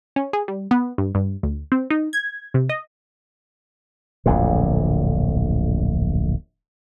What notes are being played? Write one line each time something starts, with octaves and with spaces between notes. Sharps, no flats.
C#4
G#4
G3
B3
G2
G2
D2
C4
D#4
G#6
C3
D#5
D1 A#1 F2 D3